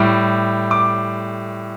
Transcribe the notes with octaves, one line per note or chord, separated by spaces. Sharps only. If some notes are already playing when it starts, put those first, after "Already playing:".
Already playing: A2 G3 D6
D6